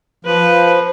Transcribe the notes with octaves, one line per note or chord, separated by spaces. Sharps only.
F3 B4